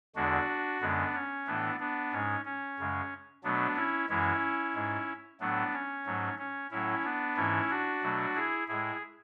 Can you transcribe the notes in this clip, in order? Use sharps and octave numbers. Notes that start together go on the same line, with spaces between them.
E2 D3 G#3 D4 F#4
F#2 D3 G#3 B3 D4
C#4
A2 E3 A3 B3 D4
B3 D4
G#2 G#3 C#4
C#4
F#2 C#3 G#3
B2 F#3 A3 B3 D4
C#4 E4
F#2 E3 G#3 C#4 E4
G#2 G#3
A2 F#3 A3 B3 D4
C#4
G#2 F#3 A3
C#4
A2 F#3 A3 C#4 E4
B3 D4
G#2 E3 A3 C#4 E4
D4 F#4
B2 F#3 A3
E4 G#4
A2 G#3 E4 G#4